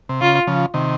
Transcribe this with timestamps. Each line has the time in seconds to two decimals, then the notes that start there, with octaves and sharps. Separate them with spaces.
0.09 C3
0.21 C#3 F4
0.47 C#3 F3
0.74 C3 D#3